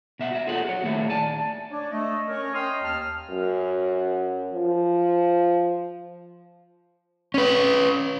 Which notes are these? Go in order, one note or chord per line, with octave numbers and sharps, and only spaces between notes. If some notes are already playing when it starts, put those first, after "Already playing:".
B2 E5 F#5
F#4 E5
F4 G#4 A4 C#5 F#5
F#4 C#5
A#2 D#3 A3 E4 G#4 E5
D5 G#5 A5
D4 C#5 D5
A3 D#5
C#4 A#4 C#5
D#5 G5 A#5 C6 D#6 F6
D#2 A5 F6
F#2
F3
C#4 B4